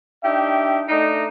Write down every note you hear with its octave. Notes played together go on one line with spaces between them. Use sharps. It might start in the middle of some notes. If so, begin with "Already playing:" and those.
D4 D#4 G4 E5 G5
A3 D4 D#4